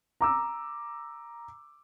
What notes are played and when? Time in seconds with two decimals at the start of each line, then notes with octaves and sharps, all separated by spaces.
0.21 A#5 D6 E6